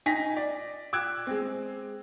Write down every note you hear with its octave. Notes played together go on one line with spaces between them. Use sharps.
D#4 G#5 A#6 B6
D5
D6 E6 F#6 G#6 D7
G#3 C4